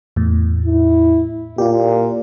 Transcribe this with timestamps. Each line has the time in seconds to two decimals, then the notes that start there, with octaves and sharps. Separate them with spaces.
0.16 E2 A2
0.66 E4
1.58 A#2 F4 G4